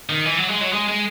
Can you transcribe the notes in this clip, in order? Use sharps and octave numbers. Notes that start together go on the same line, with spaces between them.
D#3
E3
F#3
G#3
F#3
G#3
G#3